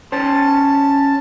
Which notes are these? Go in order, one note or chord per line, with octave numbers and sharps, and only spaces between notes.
C#4 C5 A5